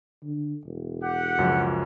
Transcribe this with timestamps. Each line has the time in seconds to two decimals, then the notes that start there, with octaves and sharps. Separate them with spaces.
0.23 D3
0.65 E1
1.03 G4 F#5
1.38 C#2 F#2 F3